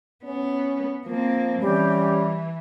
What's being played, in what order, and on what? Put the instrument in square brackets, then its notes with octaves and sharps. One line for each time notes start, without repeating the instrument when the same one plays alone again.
[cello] B3 [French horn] C#4
[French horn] F3 [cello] A#3 C4
[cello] E3 [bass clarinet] G3 [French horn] C#4 [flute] G4